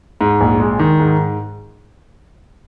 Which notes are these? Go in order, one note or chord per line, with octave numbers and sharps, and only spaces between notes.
G#2
A#1
G#3
D#3
G#2